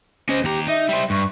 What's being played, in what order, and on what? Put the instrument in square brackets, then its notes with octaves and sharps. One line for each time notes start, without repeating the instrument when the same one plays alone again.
[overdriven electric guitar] C#4 D#5 [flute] C5
[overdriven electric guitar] D#2 A#5 [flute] G4
[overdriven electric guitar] D#4 [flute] E5
[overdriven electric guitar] G3 C5
[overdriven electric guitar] G2 [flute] C#6